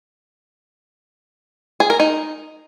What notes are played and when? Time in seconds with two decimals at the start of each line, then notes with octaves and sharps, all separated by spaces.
1.80 G#4
1.90 A#4
2.00 D#4